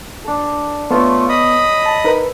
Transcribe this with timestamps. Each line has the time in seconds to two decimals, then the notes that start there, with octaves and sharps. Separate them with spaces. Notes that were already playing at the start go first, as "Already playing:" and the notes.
0.24 D4 A4
0.91 A3 B3 F4 A4 C#5
1.29 D#5 B5 D#6
1.86 A5
2.04 D#4 A#4 B4